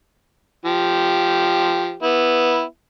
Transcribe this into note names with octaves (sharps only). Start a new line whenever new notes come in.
F3 G4
B3 E4